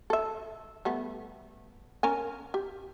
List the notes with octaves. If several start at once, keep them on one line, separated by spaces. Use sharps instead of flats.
A4 E5
G3 A3 B3
C#4 A#4 G#5
G4